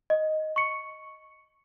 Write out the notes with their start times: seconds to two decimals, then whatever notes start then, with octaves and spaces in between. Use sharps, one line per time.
0.10 D#5
0.56 C#6 C#7